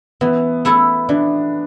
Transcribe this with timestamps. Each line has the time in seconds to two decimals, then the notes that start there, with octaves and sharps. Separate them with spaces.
0.21 E3 B3
0.65 A3 E4 A4
1.09 E3 D4